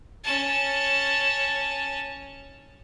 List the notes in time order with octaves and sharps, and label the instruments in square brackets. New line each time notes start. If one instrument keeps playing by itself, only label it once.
[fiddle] C#4 A5